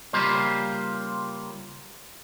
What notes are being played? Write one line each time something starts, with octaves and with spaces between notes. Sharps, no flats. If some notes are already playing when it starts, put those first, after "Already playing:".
C#3 G3 A#3 F4 G4 C5